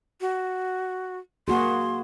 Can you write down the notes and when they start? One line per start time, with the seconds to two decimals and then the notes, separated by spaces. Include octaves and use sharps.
0.21 F#4
1.48 A#3 F#4 G#4 C6